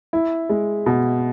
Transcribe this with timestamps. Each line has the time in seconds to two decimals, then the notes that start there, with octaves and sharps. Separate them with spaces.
0.13 E4
0.50 G#3
0.86 B2